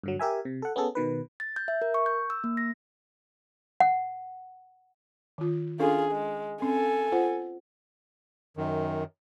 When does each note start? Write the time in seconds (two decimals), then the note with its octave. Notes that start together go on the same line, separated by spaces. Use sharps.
0.04 G2 D3 F#3
0.20 G4 A#4 E5 G#5
0.45 C3
0.62 A4 F#5
0.76 B3 C#4 G#4 A4
0.95 B2 D#3 B4
1.40 A6
1.56 G6
1.68 E5
1.82 A#4
1.94 C#6
2.06 G6
2.30 E6
2.44 A#3
2.57 A#6
3.80 F#5
5.38 D#3 F4
5.80 C#4 D4 F4 G#4 A4
6.12 G#3
6.62 C4 C#4 A4 G#5
7.12 F4 C5 F#5
8.57 F#2 D#3